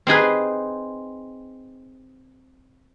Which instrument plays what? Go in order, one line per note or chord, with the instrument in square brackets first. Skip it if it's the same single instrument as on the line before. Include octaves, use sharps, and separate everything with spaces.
[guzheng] C4 D#4 G#4 B4